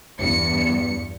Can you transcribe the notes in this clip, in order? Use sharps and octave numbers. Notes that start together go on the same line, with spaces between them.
E2 G2 C#7